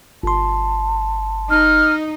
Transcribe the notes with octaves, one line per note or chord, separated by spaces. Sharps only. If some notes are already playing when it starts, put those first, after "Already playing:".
G1 A5 C6
D#4 F6